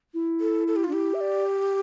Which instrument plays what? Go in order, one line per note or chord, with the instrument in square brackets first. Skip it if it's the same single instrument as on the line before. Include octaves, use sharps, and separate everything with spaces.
[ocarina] E4
[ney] A4
A4
G4
F4
[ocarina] D4
[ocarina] E4 [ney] G4
[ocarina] E5
D5